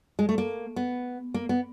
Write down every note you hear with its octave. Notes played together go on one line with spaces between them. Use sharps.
G#3
A3
A#3
B3
A#3
B3